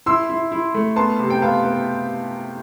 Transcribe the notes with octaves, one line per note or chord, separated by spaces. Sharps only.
E4 C6 E6
E4
E4
A3
B3 A5 C6
C3
G5
B3 F5 A5
B3